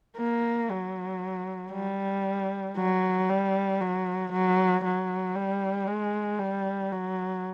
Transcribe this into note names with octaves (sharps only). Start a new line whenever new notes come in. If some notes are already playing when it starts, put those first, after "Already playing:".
A#3
F#3
G3
F#3
G3
F#3
F#3
F#3
G3
G#3
G3
F#3